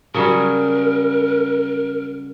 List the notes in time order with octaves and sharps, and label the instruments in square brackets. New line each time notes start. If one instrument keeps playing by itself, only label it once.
[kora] C#3 F#3 G3 [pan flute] A#4